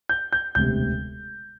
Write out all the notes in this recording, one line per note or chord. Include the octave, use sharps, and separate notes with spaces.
G6
G6
E1 D2 C3 G6